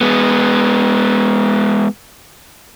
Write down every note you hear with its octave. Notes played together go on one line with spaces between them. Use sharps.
G#3 B3